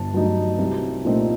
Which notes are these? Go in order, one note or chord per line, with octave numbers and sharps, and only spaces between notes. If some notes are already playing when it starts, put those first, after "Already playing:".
Already playing: G1 A5
G2 F#3 A3 D#4
C2
A#2 A3 C4 D#4